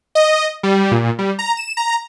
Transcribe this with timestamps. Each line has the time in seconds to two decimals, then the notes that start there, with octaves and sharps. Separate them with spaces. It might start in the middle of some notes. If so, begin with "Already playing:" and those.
0.15 D#5
0.63 G3
0.91 A#2
1.19 G3
1.39 A#5
1.57 E7
1.77 A#5